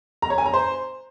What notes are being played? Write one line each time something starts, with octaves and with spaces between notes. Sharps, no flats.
A#5
C#5
G#5
A#5
C5